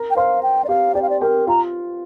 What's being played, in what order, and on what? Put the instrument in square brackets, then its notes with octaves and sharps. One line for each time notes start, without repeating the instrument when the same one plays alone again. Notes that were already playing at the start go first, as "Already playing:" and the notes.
Already playing: [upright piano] A#4 A#5
[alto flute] G5
[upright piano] C5 C6 [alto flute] F5
[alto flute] G5
D5
[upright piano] G4 G5 [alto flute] F5
[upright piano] G4 G5 [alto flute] D5
[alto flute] F5
D5
[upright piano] G4 G5 [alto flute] A#4
[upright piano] F4 F5 [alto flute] A#5